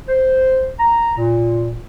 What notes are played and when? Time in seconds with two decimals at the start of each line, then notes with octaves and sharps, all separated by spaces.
0.09 C5
0.79 A#5
1.17 A#2